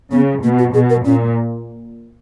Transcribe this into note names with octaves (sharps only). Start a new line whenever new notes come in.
C#3 B3
B2 A#3
F#4
B2 G#4
A#4
A#2 C#4